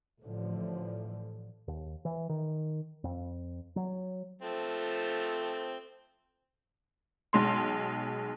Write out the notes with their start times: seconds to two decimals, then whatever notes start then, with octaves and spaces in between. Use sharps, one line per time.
0.22 A1 A2 D3 F3
1.68 D#2
2.05 E3
2.29 D#3
3.04 F2
3.76 F#3
4.42 F3 A3 C4
7.33 B1 G#3 C6